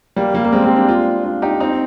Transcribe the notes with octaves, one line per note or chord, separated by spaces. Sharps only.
G3 A#3
G3 A#3
A#3
G#3 C4
G#3 C4
A#3 D4
D4 F4
D4 F4
D#4 G4
C4 D#4